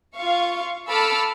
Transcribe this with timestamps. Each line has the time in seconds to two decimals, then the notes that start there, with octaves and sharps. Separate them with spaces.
0.15 F4 F5 C#6
0.89 A4 A5 B5 D6 E6 F6